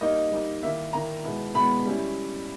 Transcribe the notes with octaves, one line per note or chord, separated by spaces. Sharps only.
G3 A#3 D#4 D#5
G3 A#3 D#4
D#3 A#3 E4 E5
D#3 A#3 E4 A#5
B2 G#3 B3 E4
B2 G#3 B3 E4 B5
G3 C#4 E4